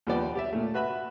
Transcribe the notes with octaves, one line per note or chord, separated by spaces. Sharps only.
D#2 F3 G3 B3 D5 G5
G4 D5 E5
A#2 A3
F#4 B4 E5 B5